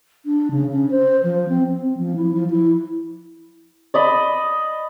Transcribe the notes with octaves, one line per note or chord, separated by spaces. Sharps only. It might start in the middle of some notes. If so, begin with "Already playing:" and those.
D4
C#3
C#4
C5
F3
C4
C4
F3
E4
F3
E4
D5 D#5 B5